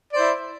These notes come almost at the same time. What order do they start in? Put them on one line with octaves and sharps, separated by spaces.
D5 C5 E4